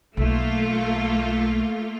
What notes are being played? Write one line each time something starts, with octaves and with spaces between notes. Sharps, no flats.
B1 A3 A#3 F4